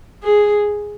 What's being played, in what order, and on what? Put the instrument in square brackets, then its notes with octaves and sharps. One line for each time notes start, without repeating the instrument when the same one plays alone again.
[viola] G#4